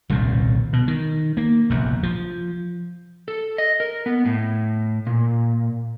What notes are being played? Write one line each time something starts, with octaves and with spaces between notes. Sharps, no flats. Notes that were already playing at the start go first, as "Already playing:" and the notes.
D#1 C2 F2 A2
B2
D#3
A#3
F1 A#1 E2
F3
A4
D#5
A#4
B3
A2
A#2